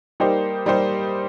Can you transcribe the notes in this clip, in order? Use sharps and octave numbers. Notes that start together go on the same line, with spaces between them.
G3 A#3 D#4 G4 C5
G3 A#3 D#4 G4 C5